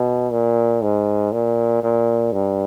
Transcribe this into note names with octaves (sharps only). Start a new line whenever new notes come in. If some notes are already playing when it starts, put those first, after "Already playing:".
Already playing: B2
A#2
G#2
A#2
A#2
G2